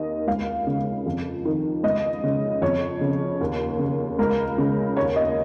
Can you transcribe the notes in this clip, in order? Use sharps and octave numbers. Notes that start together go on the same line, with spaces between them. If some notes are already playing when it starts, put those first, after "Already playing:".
Already playing: D#2 D#3 D#5
C#2 F5
C#3
F2
D#3
C#2 D#5
C#3
F2 C#5
C#3
D#2
C#3
C#2 A#4
C#3
D#2 C#5
D#5